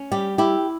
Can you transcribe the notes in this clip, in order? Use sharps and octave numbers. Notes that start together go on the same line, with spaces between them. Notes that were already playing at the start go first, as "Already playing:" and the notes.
Already playing: C#4
G3 G4
E4 G4